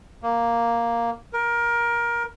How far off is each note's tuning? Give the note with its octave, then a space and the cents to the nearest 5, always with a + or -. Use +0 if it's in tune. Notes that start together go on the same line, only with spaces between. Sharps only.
A#3 +0
A#4 +20